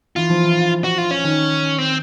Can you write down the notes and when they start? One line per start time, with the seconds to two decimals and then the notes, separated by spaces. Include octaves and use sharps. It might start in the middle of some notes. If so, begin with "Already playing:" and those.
0.16 E3 F4
0.30 F3
0.44 E3
0.84 F#4
0.98 F4
1.11 C#4
1.24 D#3
1.78 C4